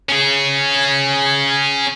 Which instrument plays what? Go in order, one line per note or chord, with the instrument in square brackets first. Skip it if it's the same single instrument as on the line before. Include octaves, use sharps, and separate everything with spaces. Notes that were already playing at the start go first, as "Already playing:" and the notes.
[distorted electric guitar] C#4 G#4